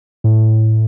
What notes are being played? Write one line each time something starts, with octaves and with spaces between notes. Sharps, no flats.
A2